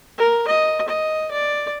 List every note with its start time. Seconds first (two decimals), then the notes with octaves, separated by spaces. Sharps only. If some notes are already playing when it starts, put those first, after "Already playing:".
0.18 A#4
0.48 D#5
0.88 D#5
1.31 D5